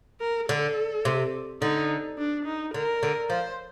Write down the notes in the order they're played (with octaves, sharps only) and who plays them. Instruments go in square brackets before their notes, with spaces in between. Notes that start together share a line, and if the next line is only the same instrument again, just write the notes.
[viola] A#4
[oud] D3 [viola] A4
[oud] C3
[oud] D3 [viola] D#4
[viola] D4
D#4
[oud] D3 [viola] A#4
[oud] D3
[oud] F3 [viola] C5